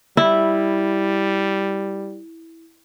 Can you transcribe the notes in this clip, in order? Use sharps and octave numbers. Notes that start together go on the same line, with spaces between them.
G3 E4